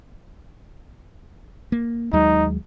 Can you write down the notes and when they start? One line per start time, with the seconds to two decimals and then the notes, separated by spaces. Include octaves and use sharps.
1.72 A#3
2.13 D#2 F#3 G#3 D#4